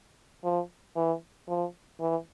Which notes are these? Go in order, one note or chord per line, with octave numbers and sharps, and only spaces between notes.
F3
E3
F3
E3